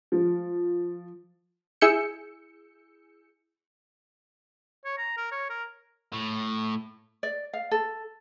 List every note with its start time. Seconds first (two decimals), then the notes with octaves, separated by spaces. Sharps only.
0.12 F3
1.81 E4 G#4 E6 G6 C#7
4.85 C#5
4.98 A#5
5.17 A#4
5.32 C#5
5.50 A#4
6.12 A2
7.23 D5
7.53 F5
7.71 A4